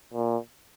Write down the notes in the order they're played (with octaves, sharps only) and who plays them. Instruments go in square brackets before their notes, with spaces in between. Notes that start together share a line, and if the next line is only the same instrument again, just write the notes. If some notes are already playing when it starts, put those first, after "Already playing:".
[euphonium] A#2